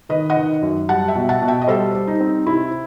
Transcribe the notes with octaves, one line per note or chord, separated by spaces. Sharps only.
D#3 B4 D#5
D#5 F#5
D#3
F#2
G3 F#5 A5
E5 G5
B2
F#5 A5
B2
E5 G5
D#5
G3 A4 C5
G3
D#4
C4
C3 E4